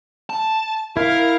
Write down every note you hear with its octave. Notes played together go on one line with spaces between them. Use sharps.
A5
E4 A#4 F5